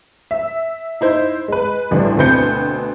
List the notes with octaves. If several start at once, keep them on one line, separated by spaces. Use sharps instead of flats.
E5
D#4 E4 C5
G#3 B4
A1 D2 G3
D2 B2 C4 B4 G6 C#7